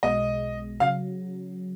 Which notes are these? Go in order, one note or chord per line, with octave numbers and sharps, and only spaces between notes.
B1 B2 G#3 D#5
C#3 F#3 F5